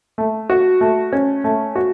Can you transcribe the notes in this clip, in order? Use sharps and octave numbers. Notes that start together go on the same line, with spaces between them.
A3
F#4
A3
C#4
A3
F#4